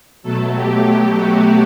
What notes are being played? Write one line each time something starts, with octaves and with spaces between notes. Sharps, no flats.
B2 F#3 A3 A4
G4
G4
F#4